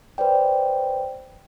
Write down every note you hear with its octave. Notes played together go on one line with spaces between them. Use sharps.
B4 C5 D5 G5